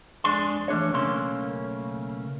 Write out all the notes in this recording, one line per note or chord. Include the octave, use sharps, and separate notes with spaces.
F2 G#3 D4 G#4 C6
E3 A3 D4 G#4 C#5
B1 C#3 A3 A#3 C#4 C6